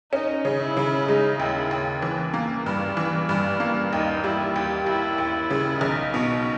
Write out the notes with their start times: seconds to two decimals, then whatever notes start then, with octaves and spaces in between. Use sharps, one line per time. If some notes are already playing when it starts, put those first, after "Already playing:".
0.13 C#4 D#4
0.45 C#3
0.60 E4
0.77 C#3
1.08 G#3 D#4
1.39 D#2 E4
1.71 D#2
2.02 E3
2.34 A#3
2.66 G2
2.97 E3
3.29 G2
3.60 A#3
3.92 D#2 D#4
4.24 G3 E4
4.56 D#2 G4
4.86 D#2 E4
5.18 D#2
5.50 C#3
5.81 B1 D#4
6.14 B2